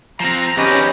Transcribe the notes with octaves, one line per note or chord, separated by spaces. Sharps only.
F3 C4 A#5 A#6
E2 C#4 D#4 F#4 G4 B4 D#5